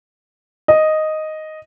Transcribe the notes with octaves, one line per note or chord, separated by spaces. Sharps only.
D#5